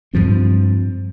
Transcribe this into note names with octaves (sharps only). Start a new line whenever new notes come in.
G2 F3 C4